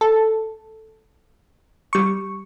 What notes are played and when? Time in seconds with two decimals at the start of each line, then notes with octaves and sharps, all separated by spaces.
0.01 A4
1.93 G3 C#6